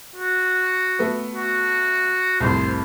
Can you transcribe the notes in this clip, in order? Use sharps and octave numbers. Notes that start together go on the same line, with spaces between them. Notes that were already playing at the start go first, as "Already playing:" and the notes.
F#4
A3 B3
F#4
C2 F2 A2 C5